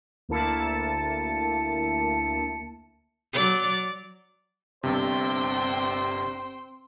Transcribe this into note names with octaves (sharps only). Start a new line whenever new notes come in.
D2 A#3 E4 A5 C#7
F#3 D5
G1 G2 C3 C4 C5 G5